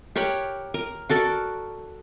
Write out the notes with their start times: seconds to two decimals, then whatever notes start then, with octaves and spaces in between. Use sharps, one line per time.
0.16 G4 A#4 C#5 F#5
0.74 A#4
1.09 F#4 A4 A#4 D5